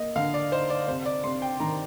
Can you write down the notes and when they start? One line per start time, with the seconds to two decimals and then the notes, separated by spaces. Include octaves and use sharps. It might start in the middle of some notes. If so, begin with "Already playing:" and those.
Already playing: A#3 D#5
0.16 D3 F5
0.34 D5
0.52 D#4 C5
0.70 D5
0.88 C3 C5
1.06 D5
1.24 C3 C6
1.42 G5
1.60 D#3 A#5